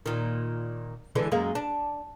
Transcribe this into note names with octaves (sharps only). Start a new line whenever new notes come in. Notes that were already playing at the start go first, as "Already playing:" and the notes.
A#2 D#3
D3 E3 G#3
F#2 G#3 A#3
D4